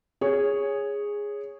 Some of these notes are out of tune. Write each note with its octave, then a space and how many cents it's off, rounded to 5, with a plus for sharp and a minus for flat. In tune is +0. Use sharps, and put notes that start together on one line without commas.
G#4 -10 C#5 +0